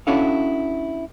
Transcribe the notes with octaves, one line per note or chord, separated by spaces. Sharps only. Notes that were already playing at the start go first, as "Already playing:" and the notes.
C#4 D4 E4 F#4 A4 F5